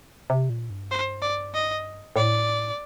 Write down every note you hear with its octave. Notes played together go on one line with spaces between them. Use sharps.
C3
A#2
G2
C5
D5
D#5
A2 D5